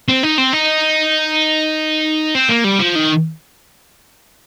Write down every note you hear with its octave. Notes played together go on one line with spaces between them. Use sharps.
C4
D#4
C4
D#4
C4
A#3
G3
F3
D#3